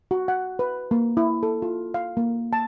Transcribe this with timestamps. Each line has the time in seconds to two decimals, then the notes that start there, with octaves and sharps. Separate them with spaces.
0.11 F#4
0.28 F#5
0.59 B4
0.91 A#3
1.17 E4
1.43 A4
1.62 F4
1.94 F5
2.17 A#3
2.53 A5